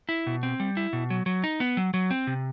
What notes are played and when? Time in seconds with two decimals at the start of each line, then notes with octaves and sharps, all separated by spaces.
0.09 E4
0.27 B2
0.43 C4
0.60 G3
0.77 E4
0.93 B2
1.10 F#3
1.26 F#3
1.44 D#4
1.60 B3
1.77 F#3
1.94 F#3
2.11 C4
2.27 C3